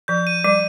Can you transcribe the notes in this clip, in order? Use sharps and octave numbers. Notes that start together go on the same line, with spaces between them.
F3 G6
D#7
G3 D#7